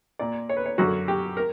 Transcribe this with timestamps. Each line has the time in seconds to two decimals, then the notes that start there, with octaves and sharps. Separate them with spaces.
0.19 A#2 D5
0.49 C#5
0.57 B4
0.66 C#5
0.78 F#2 D3 F#4
1.08 G4
1.37 A#4